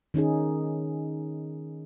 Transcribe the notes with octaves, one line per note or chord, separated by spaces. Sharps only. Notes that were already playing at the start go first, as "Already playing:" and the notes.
D#3 C#4 D#4 G#4